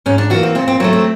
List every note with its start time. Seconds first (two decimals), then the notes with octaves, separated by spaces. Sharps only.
0.06 G#2 C#4
0.18 D4
0.30 E3 G3 A#3 F#4
0.43 C4
0.55 A#2 C4
0.68 C4
0.80 F#3 C4
0.84 A3
0.93 C4